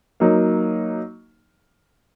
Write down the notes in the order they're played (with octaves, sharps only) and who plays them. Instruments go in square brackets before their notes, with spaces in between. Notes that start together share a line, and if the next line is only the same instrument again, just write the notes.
[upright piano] F#3 A#3 D#4